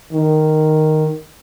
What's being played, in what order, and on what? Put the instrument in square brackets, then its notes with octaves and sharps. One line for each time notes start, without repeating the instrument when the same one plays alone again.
[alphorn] D#3